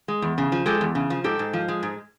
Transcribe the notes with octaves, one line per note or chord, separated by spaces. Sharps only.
G#3
E2
C#3
F3
G#3 G4 A4
E2
C#3
F3
G#2 G4 A4
G#2
F3
G#3
G#2